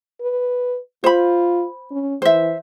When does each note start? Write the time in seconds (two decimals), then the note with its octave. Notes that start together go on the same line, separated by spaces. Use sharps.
0.21 B4
1.04 F4 C5 B5
1.91 C#4
2.22 E3 C5 E5